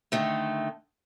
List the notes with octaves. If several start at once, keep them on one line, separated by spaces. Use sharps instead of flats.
D3 D#3 A3